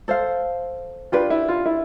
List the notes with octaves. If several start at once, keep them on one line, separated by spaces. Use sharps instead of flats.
A4 C5 F5
D4 F4 G4 B4
E4
F4
E4